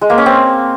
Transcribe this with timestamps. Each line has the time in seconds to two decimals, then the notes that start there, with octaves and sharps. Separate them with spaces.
0.01 G#3
0.10 A#3
0.18 C#4
0.26 C4